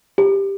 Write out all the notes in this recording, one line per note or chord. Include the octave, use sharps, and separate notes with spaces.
G4